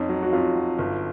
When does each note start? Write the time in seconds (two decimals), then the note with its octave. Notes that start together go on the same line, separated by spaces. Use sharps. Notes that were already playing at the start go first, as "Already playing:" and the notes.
Already playing: F2 C#4 D#4
0.09 F#3
0.23 F#4
0.33 F2 F4
0.55 F#3
0.78 G1